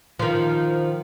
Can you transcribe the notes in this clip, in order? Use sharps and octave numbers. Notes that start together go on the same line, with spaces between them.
D#3 F3